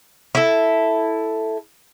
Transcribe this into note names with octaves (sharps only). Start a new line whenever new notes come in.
E4 A4